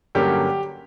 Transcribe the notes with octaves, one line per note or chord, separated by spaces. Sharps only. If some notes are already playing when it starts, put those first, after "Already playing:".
G2 D3 F#3 A#3 C#4 G4